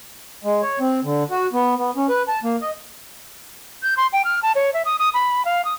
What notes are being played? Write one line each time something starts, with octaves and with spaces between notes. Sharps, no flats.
G#3
C#5
C4
D3
F#4
B3
B3
C#4
B4
A5
A#3
D#5
G6
C6
G5
F6
A5
C#5
E5
D#6
D#6
B5
F5
D#6